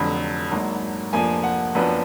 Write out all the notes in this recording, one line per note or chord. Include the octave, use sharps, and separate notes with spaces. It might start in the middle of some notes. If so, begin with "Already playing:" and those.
Already playing: F1 F2 D3 F#3 B5
G#1 G#2 F#3 A#3 D4
F1 F2 F3 A#3 D4 G#5
F#5
F#1 F#2 F3 B3 D4